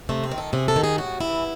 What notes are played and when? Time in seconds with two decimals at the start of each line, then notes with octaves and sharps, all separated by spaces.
0.09 C3 A3
0.24 C4
0.31 D#3
0.38 A4
0.53 C3 G#4
0.68 A4
0.76 D#3
0.84 G#4
0.98 A2 F#4
1.20 E3 E4